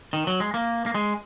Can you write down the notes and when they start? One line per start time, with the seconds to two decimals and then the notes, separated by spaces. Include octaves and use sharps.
0.13 D#3
0.27 F#3
0.40 G#3
0.54 A#3
0.86 A#3
0.95 G#3